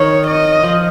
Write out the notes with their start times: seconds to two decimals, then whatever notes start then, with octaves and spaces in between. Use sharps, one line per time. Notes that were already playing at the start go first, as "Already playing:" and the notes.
Already playing: D#3 C#5
0.27 D#5
0.63 F3